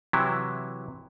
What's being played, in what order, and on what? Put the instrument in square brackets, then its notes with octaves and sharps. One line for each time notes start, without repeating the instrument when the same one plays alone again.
[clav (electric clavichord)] C3 E3 F#3 E4